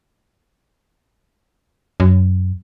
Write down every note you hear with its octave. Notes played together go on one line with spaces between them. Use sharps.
F#2